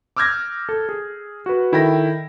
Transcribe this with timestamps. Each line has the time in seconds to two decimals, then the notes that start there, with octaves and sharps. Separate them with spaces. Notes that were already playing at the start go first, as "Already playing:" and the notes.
0.17 D6 E6 F6 G6 G#6 A#6
0.69 A4
0.89 G#4
1.46 F#4 B4
1.72 D#3 E4 A4 G5 B5 A#6